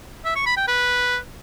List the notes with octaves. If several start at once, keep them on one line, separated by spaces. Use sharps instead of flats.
E5
C#6
B5
G5
B4